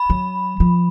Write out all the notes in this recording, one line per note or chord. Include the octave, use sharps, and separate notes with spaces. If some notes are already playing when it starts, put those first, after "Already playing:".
Already playing: B5
F#3
F3